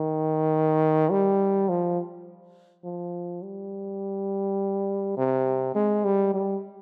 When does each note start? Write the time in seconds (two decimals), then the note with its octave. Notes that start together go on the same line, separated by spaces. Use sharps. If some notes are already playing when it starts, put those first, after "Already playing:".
Already playing: D#3
1.11 G3
1.69 F3
2.84 F3
3.42 G3
5.17 C3
5.75 G#3
6.05 G3
6.34 G3